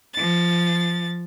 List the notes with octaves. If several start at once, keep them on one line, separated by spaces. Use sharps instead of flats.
F3 A6